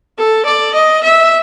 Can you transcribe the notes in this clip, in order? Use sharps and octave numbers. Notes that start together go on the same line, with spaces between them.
A4
D5
D#5
E5